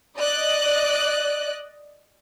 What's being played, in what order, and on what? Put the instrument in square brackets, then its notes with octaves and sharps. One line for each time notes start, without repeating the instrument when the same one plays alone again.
[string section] D5 D#5 F#6